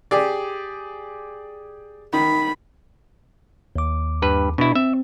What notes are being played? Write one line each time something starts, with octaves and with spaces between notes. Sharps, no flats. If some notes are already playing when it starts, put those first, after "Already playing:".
G4 G#4 D5
D#3 B5
D#2 D6
G2 B4
B2 D4 E4
C4 E5